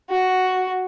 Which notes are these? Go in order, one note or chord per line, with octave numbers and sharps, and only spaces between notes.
F#4